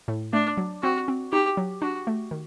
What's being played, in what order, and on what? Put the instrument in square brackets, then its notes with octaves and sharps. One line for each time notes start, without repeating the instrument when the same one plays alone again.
[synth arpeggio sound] A2
[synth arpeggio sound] A3 [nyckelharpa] D4
[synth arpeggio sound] F#3
[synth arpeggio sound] C4 [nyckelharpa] F#4
[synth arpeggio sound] C4
[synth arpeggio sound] D#4 [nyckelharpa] G4
[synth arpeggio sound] F#3
[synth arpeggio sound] D4 [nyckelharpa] F#4
[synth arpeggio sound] A3
D#3